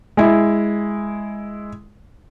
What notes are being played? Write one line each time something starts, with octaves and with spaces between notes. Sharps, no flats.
G#3 E4